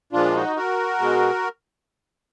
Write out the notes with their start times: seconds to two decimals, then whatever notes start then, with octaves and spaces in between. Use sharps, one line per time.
0.13 A#2 F3 G#3 D4 F4
0.35 D#4 F#4
0.56 F#4 A#4
1.00 B2 G#3